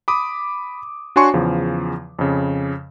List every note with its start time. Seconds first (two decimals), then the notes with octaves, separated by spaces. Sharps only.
0.08 B5 D6 D#6
1.16 D4 F#4 C#5 G#5 C6 C#6
1.34 E2 C#3 F3
2.19 F2 C#3